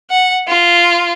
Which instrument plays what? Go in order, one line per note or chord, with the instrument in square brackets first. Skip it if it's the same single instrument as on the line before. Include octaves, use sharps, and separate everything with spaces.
[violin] F#5
F4